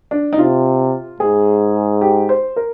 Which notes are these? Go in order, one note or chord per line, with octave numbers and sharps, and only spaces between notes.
D4
D#4
C3 F4
G#2 G#4
G4
C5
A#4